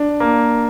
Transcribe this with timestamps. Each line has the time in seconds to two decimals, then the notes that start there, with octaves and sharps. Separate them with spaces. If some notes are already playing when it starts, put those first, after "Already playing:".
Already playing: D4
0.20 A#3